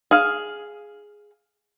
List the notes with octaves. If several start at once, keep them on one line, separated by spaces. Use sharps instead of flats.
G#4 F5